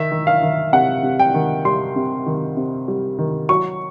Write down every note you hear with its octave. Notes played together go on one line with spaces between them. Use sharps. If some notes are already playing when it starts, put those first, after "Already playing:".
Already playing: D#3 E5
D#3
F5
D#3
C3 F#5
C3
G5
D#3
G3 C6
C3
D#3
C3
G3
D#3
F#3 C#6